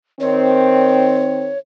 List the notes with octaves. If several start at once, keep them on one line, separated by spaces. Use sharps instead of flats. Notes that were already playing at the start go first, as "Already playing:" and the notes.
D#3 C4 C#5